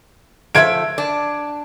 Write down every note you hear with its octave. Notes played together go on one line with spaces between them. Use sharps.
F3 A3 E5 G#6 D7
D4